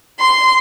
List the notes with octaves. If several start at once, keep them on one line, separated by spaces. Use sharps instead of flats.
C6